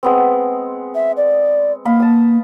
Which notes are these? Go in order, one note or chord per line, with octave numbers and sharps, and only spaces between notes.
G#3 B3 C4
E5
D5
A#3 D#5 F5 B5
A5 D#6